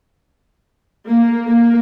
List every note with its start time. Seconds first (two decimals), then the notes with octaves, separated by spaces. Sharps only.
1.08 A#3
1.48 A#3